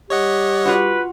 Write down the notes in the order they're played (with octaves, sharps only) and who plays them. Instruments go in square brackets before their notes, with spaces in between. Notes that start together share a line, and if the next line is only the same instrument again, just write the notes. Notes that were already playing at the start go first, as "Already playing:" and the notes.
[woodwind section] G3 G4 [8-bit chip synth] C#5 D#5 F#5
[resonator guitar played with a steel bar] F4 F#4 [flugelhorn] B4